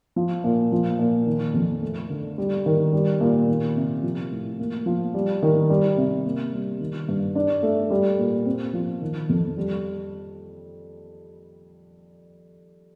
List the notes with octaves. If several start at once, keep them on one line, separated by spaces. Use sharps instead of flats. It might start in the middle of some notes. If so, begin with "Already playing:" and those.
F3
A#2
F3
A#2
D#3
F2
A3
D3
G3
D#3
G3
A#2
D#3
C3
F3
A2
A#3
F3
G3
D#3
G3
C3
A#3
G3
D#3
G2
D4
A3
G3
A#2
C4
F3
D#3
F2
G3